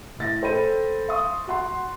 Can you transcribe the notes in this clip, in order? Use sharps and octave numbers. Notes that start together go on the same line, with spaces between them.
A2 A6 A#6
A4 C5 G5 B5 D#7
F5 C6 C#6 D#6
F#4 F#5 C6